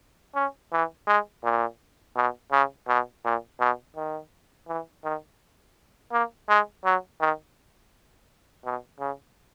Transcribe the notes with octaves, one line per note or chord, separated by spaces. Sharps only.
C#4
E3
G#3
A#2
B2
C#3
B2
A#2
B2
D#3
E3
D#3
A#3
G#3
F#3
D#3
B2
C#3